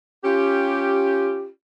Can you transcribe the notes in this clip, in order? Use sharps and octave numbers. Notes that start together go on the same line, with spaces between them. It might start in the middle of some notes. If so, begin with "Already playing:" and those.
C#4 F4 G4